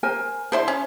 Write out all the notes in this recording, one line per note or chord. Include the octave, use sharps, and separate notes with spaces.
A#4 C5 G#5
D3 E4 C5 C6
C#4